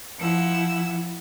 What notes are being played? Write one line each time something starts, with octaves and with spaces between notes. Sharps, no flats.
F3 E4 F#5 E6